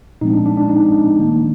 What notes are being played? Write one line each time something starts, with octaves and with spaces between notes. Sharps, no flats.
A#2 F3 G#3 C4 D#4
D4
D4
D4
D#4
D#3 A#3